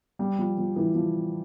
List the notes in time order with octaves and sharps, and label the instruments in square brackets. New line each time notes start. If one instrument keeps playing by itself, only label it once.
[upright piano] G3
F3
F3
E3
F3